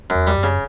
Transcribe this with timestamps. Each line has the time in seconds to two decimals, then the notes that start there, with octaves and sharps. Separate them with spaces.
0.10 F#2
0.15 E2
0.27 G3
0.38 F#2
0.43 C#3